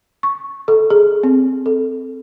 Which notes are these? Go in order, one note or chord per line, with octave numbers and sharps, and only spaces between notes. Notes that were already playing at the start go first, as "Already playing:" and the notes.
C#6
A4
G#4
C4
A4